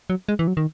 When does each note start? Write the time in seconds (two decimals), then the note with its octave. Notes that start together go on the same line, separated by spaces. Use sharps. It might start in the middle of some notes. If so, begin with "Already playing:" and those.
0.10 F#3
0.29 G#3
0.39 E3
0.47 F#3
0.57 D#3